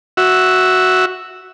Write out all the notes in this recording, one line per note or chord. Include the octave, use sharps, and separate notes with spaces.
F#4 E5